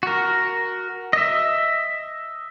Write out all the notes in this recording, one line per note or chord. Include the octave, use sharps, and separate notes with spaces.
F#4 A#4
D#5 E5